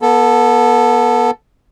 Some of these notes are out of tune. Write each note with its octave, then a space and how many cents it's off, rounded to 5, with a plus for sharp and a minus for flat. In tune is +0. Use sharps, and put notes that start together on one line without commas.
B3 -35 A4 +0